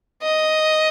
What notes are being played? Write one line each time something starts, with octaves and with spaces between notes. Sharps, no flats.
D#5